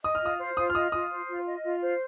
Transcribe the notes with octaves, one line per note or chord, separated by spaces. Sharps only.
D#5 D#6
F6
F4 D#6
C5
F4 D#6
F6
D#5 D#6
F4 D#6
C5
F4
D#5
F4
C5